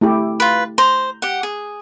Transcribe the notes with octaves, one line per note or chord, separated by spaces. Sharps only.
A3 E4 G4
F4 B4
C5 A#5
G4 F#5
G#4